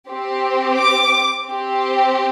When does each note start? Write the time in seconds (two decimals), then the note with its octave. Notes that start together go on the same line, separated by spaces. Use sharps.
0.09 C4 G4
0.78 D6
1.46 C4 G4